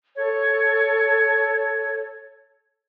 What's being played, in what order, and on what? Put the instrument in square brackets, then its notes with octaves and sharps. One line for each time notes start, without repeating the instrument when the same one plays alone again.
[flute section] A4 C#5